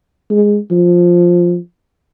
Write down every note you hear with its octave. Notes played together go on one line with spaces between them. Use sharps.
G#3
F3